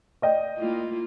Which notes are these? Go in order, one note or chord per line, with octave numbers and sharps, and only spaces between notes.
D5 D#5 G5
A#3 E4 F4